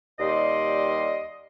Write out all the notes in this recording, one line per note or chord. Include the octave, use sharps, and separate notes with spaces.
D#2 G3 G4 D5 D#5 C6